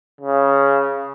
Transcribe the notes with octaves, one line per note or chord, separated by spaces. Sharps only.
C#3